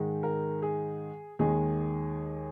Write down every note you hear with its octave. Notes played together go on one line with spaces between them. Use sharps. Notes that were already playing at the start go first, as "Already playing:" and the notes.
Already playing: G#2 D#3 G#3
A#4
G#4
D#2 D#3 G#3 G#4